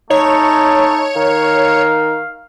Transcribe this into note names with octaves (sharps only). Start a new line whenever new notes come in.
A3 D#4 C#5
D#3 F5